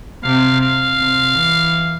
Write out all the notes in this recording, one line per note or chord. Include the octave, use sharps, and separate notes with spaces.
C3 F5
F5
C3
E3